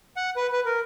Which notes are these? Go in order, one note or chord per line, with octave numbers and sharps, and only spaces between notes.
F#5
B4
B4
A#4